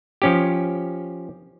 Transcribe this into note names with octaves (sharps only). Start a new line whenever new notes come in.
F3 C#4 G4